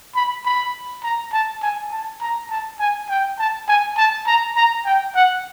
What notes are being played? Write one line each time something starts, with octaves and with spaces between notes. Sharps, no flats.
B5
B5
A#5
A5
G#5
A5
A#5
A5
G#5
G5
A5
G#5
A5
A#5
A#5
G5
F#5